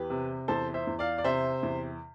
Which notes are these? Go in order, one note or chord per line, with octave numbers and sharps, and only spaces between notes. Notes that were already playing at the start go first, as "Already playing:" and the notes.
Already playing: E2 G4 B4
C3
E2 A4 C5
C5 E5
E2
D5 F5
D5
C3 C5 E5
E2